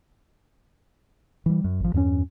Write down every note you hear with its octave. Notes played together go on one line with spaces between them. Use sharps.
E3 G3
F#2
G#1 F3
E2 G2 A3 C#4